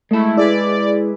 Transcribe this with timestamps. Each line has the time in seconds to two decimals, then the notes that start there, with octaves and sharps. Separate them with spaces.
0.11 G#3 A3 E4 A5
0.37 E4 G#4 B4 D5